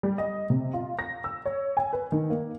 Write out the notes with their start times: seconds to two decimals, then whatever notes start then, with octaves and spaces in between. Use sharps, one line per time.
0.03 G3
0.18 D#5
0.50 C3
0.73 F4
0.99 A#6
1.24 E6
1.45 C#5
1.77 G#5
1.93 B4
2.12 D#3
2.30 A#3